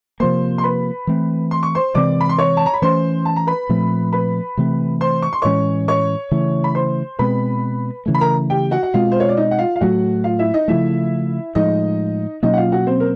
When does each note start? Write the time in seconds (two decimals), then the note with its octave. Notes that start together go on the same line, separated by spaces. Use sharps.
0.20 C3 F3 A#3 C5 C6
0.58 C6
0.64 B4 B5
1.07 E3 A3 C4
1.51 C6
1.63 C#6
1.75 C5 C6
1.94 C3 E3 G#3 C4 D5 D6
2.21 B5
2.29 C6
2.38 C#5 C#6
2.57 A5
2.66 A#5
2.74 B5
2.82 E3 A3 C#4 C5 C6
3.25 A5
3.36 A#5
3.47 B4 B5
3.69 A#2 F3 A3 C4
4.13 B4 B5
4.57 C3 E3 A3 C4
5.01 C5 C6
5.22 C#6
5.33 C6
5.42 A2 E3 G#3 C#4 C#5 C#6
5.88 C#5 C#6
6.31 C#3 E3 A3
6.64 B5
6.75 C5 C6
7.19 B2 G#3 C4 B4 B5
8.06 C#3 E3 A3
8.14 B5
8.21 A#4 A#5
8.50 G4 G5
8.71 F#4 F#5
8.83 F#5
8.94 B2 G#3 C4 F4 F5
9.12 C5
9.20 C#5
9.29 D5
9.37 D#4 D#5
9.51 F#5
9.59 F4 F5
9.76 F5
9.81 A2 F#3 A3 F#4 F#5
10.24 F4 F5
10.39 E4 E5
10.54 D#4 D#5
10.68 C#3 F3 A3 E4 E5
11.55 A2 F3 G#3 D#4 D#5
12.43 B2 F#3 A#3 C#4 D#4 D#5
12.54 F#5
12.57 F4 F5
12.72 F#4 F#5
12.87 C4 C5
13.00 A#4